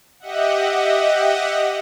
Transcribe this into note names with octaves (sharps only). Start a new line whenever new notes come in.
G4 D#5 E5 F#5